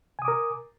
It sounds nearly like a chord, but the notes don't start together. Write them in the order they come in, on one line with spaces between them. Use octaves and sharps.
G#5 D#6 D6 A#4